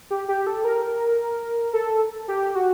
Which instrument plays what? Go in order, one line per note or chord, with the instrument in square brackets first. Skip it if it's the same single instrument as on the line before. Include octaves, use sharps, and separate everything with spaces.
[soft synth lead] G4
G4
A4
A#4
A4
G4
F#4